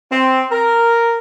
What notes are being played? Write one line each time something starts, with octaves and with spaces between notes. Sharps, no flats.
C4
A#4